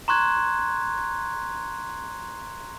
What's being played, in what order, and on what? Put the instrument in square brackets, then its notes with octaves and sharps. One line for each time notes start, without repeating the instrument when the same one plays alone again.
[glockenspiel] A#5 C6 C#6 F#6 G#6